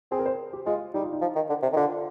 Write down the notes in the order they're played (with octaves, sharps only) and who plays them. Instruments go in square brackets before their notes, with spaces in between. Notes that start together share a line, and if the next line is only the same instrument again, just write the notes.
[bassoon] C4 [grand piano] G#4
[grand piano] A#4
C5
G4
[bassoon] G#3 [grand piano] F4
[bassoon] G3 [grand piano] D#4
[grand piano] F4
D#4
[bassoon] F3
D#3
D3
C3
D#3
[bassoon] D3 [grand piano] F4